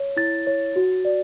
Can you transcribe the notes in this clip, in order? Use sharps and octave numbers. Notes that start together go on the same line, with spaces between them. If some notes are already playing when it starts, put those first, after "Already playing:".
Already playing: C#5
E4 A6
C#5
F#4
D5